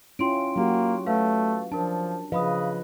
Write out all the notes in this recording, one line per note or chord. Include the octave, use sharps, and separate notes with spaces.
C#4 E4 F4 G5 C6 D7
F#3 A#3 F#4 G4
A3 B4 F5
F3 D4 A#4 A5
C#3 F3 B4 D#5 F5 B5 D#6